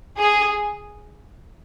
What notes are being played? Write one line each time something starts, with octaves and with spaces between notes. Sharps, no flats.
G#4